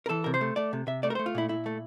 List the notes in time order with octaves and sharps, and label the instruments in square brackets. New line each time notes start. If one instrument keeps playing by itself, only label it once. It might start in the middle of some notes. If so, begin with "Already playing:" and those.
[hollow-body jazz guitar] A#4
E3 A4
C3 A#4
C5
A3
A3 D5
C3
C3 E5
A3 D5
A#4
A3 C5
F4
A#2 E4
A#2 E4
A3